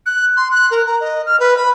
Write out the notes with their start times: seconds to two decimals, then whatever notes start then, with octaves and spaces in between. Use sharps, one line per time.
0.06 F#6
0.37 C6
0.51 F#6
0.71 A#4
0.87 A#5
1.01 D#5
1.26 F6
1.40 B4
1.57 B5